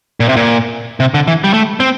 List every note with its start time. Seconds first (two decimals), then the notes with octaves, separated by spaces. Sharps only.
0.20 A#2
0.29 C3
0.36 A#2
1.00 C3
1.14 D3
1.28 E3
1.44 G3
1.54 A3
1.80 C4